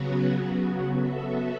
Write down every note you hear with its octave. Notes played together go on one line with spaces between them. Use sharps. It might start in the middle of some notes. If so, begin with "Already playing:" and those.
Already playing: C#3 F#3 B3 F#4
B3 F#4 A4 E5